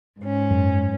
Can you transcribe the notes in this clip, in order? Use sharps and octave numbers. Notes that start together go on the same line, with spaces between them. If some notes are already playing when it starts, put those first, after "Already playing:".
G#2 C#4
F#2